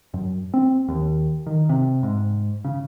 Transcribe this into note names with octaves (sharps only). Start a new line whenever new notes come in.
F#2
C4
D#2
D#3
C3
G#2
C#3